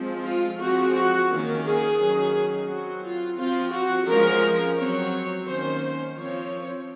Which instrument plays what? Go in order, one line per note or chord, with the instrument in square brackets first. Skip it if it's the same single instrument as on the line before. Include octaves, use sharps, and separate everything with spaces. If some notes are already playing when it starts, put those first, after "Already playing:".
Already playing: [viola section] F3 G#3 C4
F4
F3 G#3 C4 F#4
F#4
D#3 A#3 C#4
G#4
D#3 F#3 C#4
F#3 C4 F#4
F4
F3 C4 F4
F#4
F3 G#3 C#4 A#4
F#3 C4 C#5
D#3 A#3 C#4 C5
F3 C4 C#5